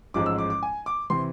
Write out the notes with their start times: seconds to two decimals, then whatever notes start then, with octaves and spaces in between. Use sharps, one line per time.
0.14 A1 G#2 F3 G#3 D6
0.26 E6
0.38 D6
0.50 D6
0.63 G#5
0.86 D6
1.10 C3 E3 C6